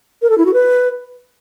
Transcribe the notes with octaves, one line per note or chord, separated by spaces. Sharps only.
A#4
A4
E4
F#4
B4